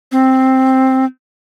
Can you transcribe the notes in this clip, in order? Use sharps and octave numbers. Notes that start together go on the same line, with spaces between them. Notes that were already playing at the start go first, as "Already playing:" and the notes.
C4